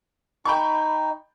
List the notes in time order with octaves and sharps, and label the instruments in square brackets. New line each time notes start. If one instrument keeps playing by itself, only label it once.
[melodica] D#4 [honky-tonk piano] G5 B5 C#6